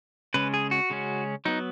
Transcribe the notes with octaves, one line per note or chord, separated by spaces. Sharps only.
C#3 G#3 C#4 B4
G#4
F#4
C#3 G#3 C#4
F#3 B3 D#4